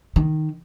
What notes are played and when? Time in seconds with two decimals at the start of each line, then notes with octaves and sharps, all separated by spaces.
0.16 D#3